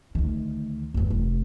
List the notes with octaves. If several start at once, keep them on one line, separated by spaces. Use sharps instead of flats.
D2 D#3
G1 E2
F1